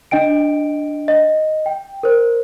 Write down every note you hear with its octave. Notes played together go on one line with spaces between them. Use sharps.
D4 D#5 G5 D7
D#5
G5
A#4 C5